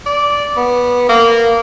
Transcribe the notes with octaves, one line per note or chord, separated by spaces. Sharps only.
D5
B3
A#3